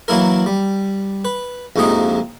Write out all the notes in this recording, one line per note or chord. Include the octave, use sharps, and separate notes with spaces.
E3 F#3 A#3 E4 A#4
G3
B4
A#1 F2 C3 G#3 D#4 D#5